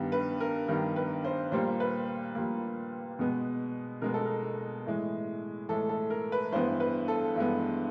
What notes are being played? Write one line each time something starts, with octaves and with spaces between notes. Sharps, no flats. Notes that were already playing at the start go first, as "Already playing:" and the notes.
Already playing: G2 D#3 G3 B3
B4
A#4
G2 D#3 G3 B3 A#4
B4
C5
A#2 G3 A#3 C5
B4
A#2 G3 A#3
B2 G#3 B3
B2 G#3 B3 A#4
A4
A#4
A2 E3 G#3
A2 E3 G#3 A4
A4
A#4
B4
G2 E3 G#3 B3 C5
B4
A4
G2 E3 G#3 B3